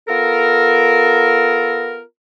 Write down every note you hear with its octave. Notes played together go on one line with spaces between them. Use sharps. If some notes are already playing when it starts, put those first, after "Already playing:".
B3 F4 A4 A#4